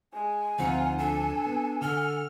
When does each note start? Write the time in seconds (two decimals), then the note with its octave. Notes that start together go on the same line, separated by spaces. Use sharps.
0.13 G#3 G#5
0.59 D2 F3 C4 D#4 F4 F#5
0.99 D4 A4
1.46 B3
1.81 D3 A4 F6